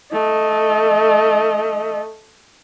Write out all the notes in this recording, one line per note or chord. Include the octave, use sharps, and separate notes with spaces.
A3 D#5